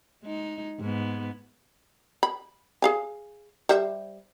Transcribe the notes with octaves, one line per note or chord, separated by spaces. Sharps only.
G#3 D#4
G#2 B3
B5
G#4 F5 G#5
G3 C5 E5